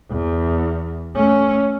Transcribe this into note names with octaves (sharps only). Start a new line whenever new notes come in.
E2
A3 C#4